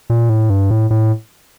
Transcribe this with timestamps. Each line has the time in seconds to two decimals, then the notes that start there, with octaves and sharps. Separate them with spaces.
0.10 A#2
0.29 A2
0.50 G2
0.71 A2
0.91 A2